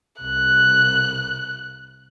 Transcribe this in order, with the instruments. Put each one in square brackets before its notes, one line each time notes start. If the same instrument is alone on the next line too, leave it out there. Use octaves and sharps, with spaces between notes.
[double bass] C2 [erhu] F#6